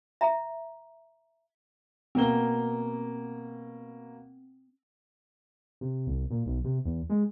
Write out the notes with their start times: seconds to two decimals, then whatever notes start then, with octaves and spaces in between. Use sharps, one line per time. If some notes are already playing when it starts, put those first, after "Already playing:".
0.21 E5 A#5
2.15 B2 A#3 C4 G7
5.81 C3
6.07 C2
6.31 A#2
6.46 B1
6.64 C3
6.85 E2
7.10 G#3